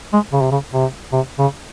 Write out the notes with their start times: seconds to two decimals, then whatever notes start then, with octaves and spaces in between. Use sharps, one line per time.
0.13 G#3
0.33 C#3
0.41 C3
0.51 C#3
0.73 C3
1.12 C3
1.39 C#3